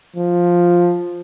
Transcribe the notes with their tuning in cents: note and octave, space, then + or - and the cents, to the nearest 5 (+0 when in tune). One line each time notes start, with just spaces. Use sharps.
F3 +5